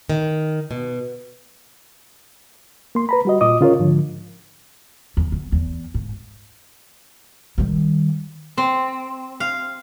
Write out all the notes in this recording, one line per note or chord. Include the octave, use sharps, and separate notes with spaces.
D#3
B2
A#3 C6
B4 A#5 B5
G3 F#4 D#5
A#2 F4 D#5 D6 D#6
C#3 F4 A#4 C#5
G#2 D3 F3
E2
E2
E2
G#2
D#3 G3
C4
F5